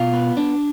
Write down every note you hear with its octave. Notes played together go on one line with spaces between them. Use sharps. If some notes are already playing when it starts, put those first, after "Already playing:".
Already playing: B2 F4 F5
B3
D4